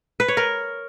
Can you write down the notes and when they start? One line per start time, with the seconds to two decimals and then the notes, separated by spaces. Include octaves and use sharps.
0.20 B4
0.28 C#5
0.37 A#4